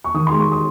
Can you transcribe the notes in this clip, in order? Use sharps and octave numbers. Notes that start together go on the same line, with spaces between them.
C#6
D#3 D#6
G#3 C6
C#6
D#6